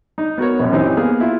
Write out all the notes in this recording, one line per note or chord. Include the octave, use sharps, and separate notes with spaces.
D#4
B3 F#4 A#4 C#5
A#1 F#2
E3 C4 C#4 D#4 G4
A#3 B3 G#4 F5
E4 F4